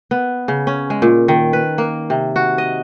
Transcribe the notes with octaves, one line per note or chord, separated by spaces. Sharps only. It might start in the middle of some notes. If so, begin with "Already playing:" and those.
B3
C#3
C#4
G#3
A#2
D#3
B4
A#3
C3
F#4
D#5